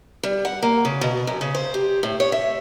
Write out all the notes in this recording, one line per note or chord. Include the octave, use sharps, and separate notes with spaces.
G3
F#5
A#3
C#3
B2
F#2
C#3
C5
G4
A2
C#5
E5